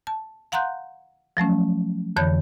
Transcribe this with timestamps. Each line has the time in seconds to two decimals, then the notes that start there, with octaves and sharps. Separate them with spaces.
0.07 A5
0.52 F5 F#5 A#5 C6 F#6 G6
1.37 F3 F#3 A3 C#4
2.16 F2 D3 E3 C#5 B5 G6